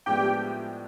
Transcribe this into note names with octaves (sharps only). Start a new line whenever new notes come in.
A2 F3 G#3 B3 D4 G4 G5